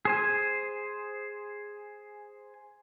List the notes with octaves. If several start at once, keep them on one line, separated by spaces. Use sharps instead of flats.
G#4 C5 G#5